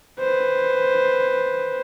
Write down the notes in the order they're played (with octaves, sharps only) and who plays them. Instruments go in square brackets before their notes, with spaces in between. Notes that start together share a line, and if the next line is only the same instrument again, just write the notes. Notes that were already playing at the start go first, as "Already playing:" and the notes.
[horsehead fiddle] B4 C5